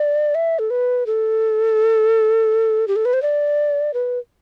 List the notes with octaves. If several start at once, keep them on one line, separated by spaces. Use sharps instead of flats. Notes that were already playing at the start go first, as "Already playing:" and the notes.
Already playing: D5
E5
A4
B4
A4
G4
A4
B4
C5
D5
B4